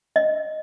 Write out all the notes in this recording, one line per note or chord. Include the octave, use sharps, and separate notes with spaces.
D#5